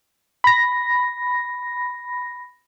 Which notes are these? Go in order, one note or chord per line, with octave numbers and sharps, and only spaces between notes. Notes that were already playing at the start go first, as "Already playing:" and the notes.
B5 A#6